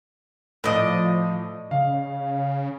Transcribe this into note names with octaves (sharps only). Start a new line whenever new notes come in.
A2 F3 D5 D#5
C#3 F5